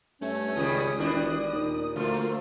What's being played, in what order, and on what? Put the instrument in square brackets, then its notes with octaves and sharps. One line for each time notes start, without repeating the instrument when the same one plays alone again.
[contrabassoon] G2 [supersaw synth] A3 [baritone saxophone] C#4
[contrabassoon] C#2 [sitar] G2 D#3 G3 [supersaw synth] D#6
[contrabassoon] E1 [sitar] D#3 G3 D4
[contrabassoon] D#2 [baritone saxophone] A#2
[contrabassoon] D2 [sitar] F3 A3 [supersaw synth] A#3 F4